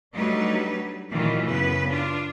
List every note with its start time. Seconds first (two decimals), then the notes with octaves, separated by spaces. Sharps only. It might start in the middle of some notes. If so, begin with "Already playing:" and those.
0.13 F#3 G3 A3 D4 D#4 B4
1.10 A#2 D#3 E3 F#3 A3 F4
1.45 F#2 C#3 B3 B4
1.88 D4 F4